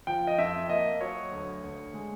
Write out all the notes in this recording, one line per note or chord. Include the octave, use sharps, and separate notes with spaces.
F3 G5
D#5
F2 E5
A#3 D#5
F#3 C#5
D2
D2
G#3